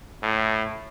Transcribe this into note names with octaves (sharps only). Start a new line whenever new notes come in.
A2